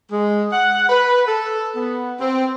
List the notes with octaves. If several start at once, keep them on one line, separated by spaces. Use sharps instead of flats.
G#3
F#5
B4
A4
B3
C4